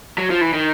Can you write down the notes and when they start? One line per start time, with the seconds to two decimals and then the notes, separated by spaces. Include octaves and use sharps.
0.18 F#3
0.30 F3
0.41 E3
0.53 D#3